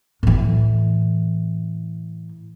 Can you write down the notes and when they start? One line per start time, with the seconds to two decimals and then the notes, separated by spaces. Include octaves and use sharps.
0.23 A2 E3